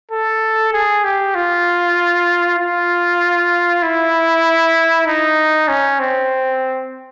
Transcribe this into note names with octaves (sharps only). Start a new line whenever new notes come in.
A4
G#4
G4
F4
F4
E4
D#4
C#4
C4